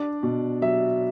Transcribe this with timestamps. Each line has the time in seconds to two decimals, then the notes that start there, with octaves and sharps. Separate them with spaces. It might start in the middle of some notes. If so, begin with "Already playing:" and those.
Already playing: D4 D5
0.23 B2
0.62 F#3 E5